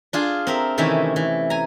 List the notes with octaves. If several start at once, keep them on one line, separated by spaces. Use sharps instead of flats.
D4 F4 G#4
C4 A#4 E5
C3 D#3 E3 A3 C#4 E5
E3
G#5 A#5